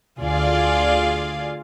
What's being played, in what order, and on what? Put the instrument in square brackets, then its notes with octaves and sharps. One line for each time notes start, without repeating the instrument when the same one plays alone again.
[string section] D2 F4 G#4 D5 F5